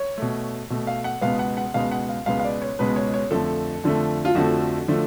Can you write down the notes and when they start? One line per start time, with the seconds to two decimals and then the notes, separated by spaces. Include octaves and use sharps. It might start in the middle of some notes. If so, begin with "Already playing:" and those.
Already playing: C#5
0.18 B2 A3
0.70 B2 A3
0.87 F5
1.04 F#5
1.21 C#2 B2 G#3 B3 F5
1.39 F#5
1.57 F#5
1.74 C#2 B2 G#3 B3 F5
1.91 F#5
2.09 F5
2.26 C#2 B2 G#3 B3 F5
2.39 F5
2.44 D5
2.62 C#5
2.79 C#2 B2 G#3 B3 B4
2.96 C#5
3.14 C#5
3.31 F2 D3 F3 A3 A4
3.83 F2 D3 F3 A3
4.25 F4
4.35 F2 D3 F3 A3 F#4
4.88 D3 F3 A3